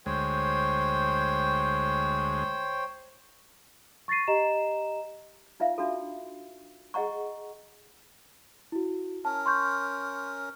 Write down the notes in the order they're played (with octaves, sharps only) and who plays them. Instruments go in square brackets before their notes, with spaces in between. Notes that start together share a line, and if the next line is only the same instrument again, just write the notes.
[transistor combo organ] D2 G#3 [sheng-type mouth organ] C5 C#5 G5
[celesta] C#6 A6 A#6 C7 D#7
G4 D#5 A#5 E7
[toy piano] D#4 F4 E5 F5
D4 F4 F#4 A4
G#4 D#5 F#5 A#5 C#6
[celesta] E4 F#4
[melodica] C#4 A#4 [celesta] A5
[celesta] C6 C#6 G6